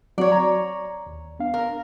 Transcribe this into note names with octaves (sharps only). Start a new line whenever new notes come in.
F#3 C4 F#4 C#5 D5
A#5
D#2
B3 D4 F5
A#4